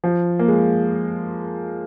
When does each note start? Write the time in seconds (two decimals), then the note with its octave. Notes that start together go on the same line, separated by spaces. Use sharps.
0.04 F3
0.39 A#3
0.48 G#3